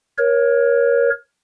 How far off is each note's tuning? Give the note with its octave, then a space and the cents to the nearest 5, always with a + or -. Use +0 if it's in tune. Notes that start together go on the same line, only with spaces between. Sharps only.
A#4 +25 C#5 -5